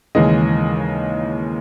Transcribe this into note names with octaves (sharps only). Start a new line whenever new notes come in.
D#2 C#3 E3 G#3 D#5